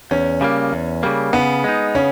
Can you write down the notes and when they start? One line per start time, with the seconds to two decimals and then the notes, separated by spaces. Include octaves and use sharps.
0.11 E2 C#4
0.41 C#3 G3 A#3
0.73 E2
1.03 C#3 G3 A#3
1.33 C#3 B3
1.64 G#3 D#4
1.95 C#3 C#4